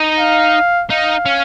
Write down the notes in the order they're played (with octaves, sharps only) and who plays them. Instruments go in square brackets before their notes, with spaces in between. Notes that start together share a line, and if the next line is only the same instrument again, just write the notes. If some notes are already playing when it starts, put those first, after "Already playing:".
Already playing: [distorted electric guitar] D#4
[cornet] F5
[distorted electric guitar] D#4 [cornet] F5
[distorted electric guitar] C#4